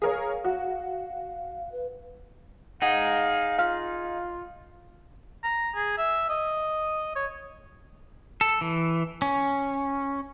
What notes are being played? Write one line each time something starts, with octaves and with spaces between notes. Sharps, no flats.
G#4 A#4 C#5 F5
F#4
B4
D#4 G#4 F5 F#5
F4 F5 F6
A#5
G#4
E5
D#5
C#5
A4
E3
C#4